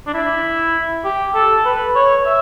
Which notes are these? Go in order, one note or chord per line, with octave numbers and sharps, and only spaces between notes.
D4
E4
G4
A4
B4
C#5
E5